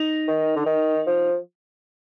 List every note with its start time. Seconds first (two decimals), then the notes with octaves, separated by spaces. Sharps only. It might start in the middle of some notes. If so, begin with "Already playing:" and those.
Already playing: D#4
0.28 D#3
0.56 D3
0.66 D#3
1.06 F3